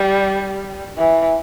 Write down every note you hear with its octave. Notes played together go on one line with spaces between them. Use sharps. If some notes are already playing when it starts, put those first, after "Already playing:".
Already playing: G3
E3